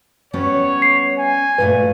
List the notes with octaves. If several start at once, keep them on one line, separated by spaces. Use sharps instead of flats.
G3 B3 C#4 C#5
C7
G#5
G2 A#2 A3 B4